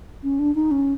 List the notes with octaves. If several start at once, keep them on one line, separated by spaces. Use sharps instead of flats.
C#4
D4
D#4
C#4